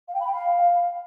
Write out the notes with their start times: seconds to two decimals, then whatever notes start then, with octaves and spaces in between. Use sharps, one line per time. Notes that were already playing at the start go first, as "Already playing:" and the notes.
0.08 F5
0.14 G5
0.20 B5
0.26 G5
0.32 F5